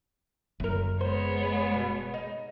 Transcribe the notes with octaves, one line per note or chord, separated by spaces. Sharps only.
F#1 F#2 A#4
G#3 B3 C5 C#5
B2
D#4